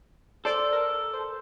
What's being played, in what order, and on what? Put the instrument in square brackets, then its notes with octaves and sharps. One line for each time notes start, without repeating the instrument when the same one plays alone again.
[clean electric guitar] A4 [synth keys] C5 D5 D6
[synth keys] A#4
C5